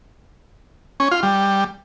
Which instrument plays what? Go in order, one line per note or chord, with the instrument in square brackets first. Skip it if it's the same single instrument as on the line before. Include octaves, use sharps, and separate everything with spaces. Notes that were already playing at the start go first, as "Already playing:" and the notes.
[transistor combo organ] C#4
F4
G3